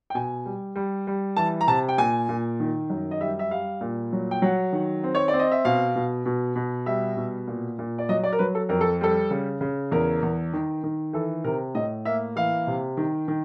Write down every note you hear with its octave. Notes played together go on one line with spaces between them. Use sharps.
G5
B2 G#5
G3
G3
G3
E3 A5
A#5
C3 A5
G5
A#2 G#5
A#2
D#3
F#2
D#5
G3 E5
E5
G3 F5
A#2
F#3
G5
F#3 F#5
D#3
C4
C#5
D5
C4
D#5
E5
B2 F5
B2
B2
B2
G3 E5
B2
A#2
A#2
D5
F#3 D#5
D5
A#4
F#3 B4
A4
F2 A#4
A4
G3 A4
C#3
C#3
E2 A#4
E2
D#3
D#3
E3 A4
C3 A#4
A2 D#5
A#3 E5
E3 F5
C3
D#3
D#3